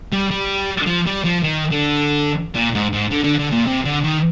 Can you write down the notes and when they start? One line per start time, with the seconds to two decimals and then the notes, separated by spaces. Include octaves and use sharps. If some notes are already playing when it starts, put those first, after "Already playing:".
0.12 G3
0.31 G3
0.87 F3
1.06 G3
1.24 F3
1.43 D#3
1.71 D3
2.55 A#2
2.74 G#2
2.93 G#2
3.11 D3
3.24 D3
3.39 D3
3.53 A#2
3.67 C3
3.85 D3
4.04 D#3